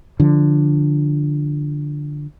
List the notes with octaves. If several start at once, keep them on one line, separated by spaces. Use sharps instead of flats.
D3 F3